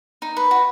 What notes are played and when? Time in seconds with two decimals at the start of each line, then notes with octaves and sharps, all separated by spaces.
0.22 D#4
0.37 B4
0.51 F#4